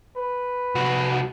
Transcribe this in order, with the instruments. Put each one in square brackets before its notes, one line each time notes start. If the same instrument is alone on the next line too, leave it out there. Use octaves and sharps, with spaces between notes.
[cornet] B4
[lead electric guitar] C2 F#4